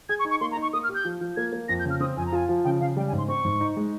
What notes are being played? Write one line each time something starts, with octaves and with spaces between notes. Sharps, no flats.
G#4 G#6
C#6
D#4
C#6
A#3 C6
A#5
D#4
C#6
A#3 D#6
F6
G4
G6
F3
F3
A#3 G#6
A#3
F2 A#6
G6
C#3
F6
C4 D#6
F2 G#5
A#5
F4 G#5
F3
C#3 G5
C#3 F5
G3 G5
G#5
G#2
C6
C4 C#6
G#2
D#4
G#3